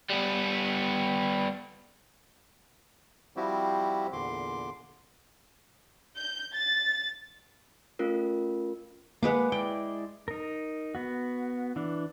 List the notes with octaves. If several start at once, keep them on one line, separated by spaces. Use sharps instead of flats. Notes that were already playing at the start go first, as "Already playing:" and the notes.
G3 B3
F3 G3 C4 E4 F#4 G4
E2 A#2 D3 C6 D6
G6
A6
A3 C#4 F4 A#4
G#3 A#3 B4 F#5 D6
G#3 E4 D5 G5
D#4 A#4
B3 F#4
E3 D4